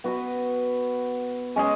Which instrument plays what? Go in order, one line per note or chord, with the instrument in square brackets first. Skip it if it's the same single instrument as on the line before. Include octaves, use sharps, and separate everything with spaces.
[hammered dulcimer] B3 F#4 B4
G#3 C#4 G#4